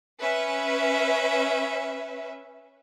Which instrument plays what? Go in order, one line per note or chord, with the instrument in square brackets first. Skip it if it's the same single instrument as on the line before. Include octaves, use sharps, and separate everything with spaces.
[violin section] C#4 B4 E5